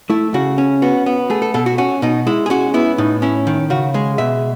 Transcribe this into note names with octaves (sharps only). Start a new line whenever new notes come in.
A3 E4
C#3 F#4
C#4
B3 F#4
B3
A3 G#4
A4
B2 A4
F#4
C#4 F#4
B2 D#4
G#3 E4
G#4
C#4 F#4
B3 E4
A2 D#4
C#4 E4
D#3
C#3 F#4
G#3 G#4
B2 E5